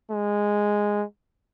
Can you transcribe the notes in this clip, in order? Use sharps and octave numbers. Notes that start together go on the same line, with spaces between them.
G#3